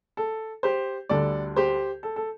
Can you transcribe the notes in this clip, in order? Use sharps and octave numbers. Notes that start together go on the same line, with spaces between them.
A4
G4 C5
D2 D3 G3 A4 D5
G4 C5
A4
A4